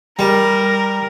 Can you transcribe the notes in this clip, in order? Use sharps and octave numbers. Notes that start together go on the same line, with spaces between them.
G3 A#4